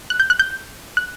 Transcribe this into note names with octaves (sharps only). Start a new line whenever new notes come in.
F#6
G6
F#6
G6
F#6